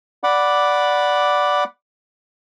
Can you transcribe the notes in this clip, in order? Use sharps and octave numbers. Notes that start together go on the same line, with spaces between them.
D5 F#5 B5 D6